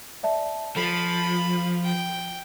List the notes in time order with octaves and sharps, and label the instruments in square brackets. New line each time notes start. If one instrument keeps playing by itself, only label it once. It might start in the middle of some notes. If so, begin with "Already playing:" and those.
[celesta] D5 E5 A5
[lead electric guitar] F3 [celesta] A4 [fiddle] B5
[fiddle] G5